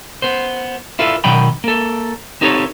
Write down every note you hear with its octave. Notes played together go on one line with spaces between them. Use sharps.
B3 C5
E4 F4 A4 B4
B2 D#3 F#3 D#5 G5 B5
A#3 A4
C4 D#4 G4 A4 B4 C#5